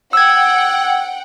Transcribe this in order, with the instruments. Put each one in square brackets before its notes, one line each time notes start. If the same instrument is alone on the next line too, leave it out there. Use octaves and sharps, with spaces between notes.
[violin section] F#5 G5 [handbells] E6 G#6